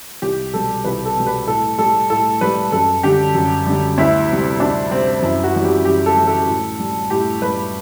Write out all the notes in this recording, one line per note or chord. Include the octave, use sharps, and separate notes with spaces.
C2 G4
B2 G3 A4
C2 B4
A4
B2 G3
B4
A2 A4
G3 A4
A2 A4
G3 B4
F#2 A4
D3 G3 G4
F#2
D3 G3
D2 E4
C3 G3
D2 D4
C3 G3 C4
F#2 E4
F#4
E3 G3
G4
F#2 G4
A4
E3 G3
A4
A2
G3
A2 G4
G3 B4